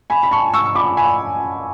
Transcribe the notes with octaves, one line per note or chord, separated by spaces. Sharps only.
G#5 B5
B5
A5 C#6
C#6 E6
C#6
B5 D6
G#5 B5